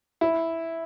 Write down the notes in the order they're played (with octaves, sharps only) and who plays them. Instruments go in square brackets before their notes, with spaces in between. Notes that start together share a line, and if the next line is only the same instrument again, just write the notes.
[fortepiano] E4